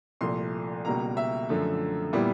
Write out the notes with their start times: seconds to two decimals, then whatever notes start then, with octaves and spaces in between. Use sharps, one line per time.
0.21 C2 A#2 F3 A3 C6
0.85 C#2 B2 G3 A#3 A#5
1.17 E5
1.49 F#2 D3 F3 A3
2.13 A#2 G3 B3 E4